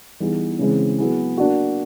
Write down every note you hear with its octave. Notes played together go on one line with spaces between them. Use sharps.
E3 G3 B3 D#4 G#4
C#3 E3 G#3 C4
F#3 B3 E4 G#4
A#3 D4 F#4